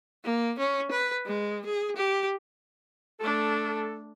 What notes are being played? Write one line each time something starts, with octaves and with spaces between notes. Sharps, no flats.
A#3
C#4
B4
G#3
G#4
G4
A3 D4 A4